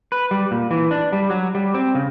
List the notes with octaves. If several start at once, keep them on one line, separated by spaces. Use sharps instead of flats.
B4
G3
A#2
E3
D4
G3
F#3
G3
C4
C#3